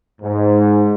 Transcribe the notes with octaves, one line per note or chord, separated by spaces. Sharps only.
G#2